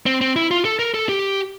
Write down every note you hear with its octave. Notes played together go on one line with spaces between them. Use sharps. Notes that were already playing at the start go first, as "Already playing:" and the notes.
C4
C4
E4
F4
A4
A#4
A4
G4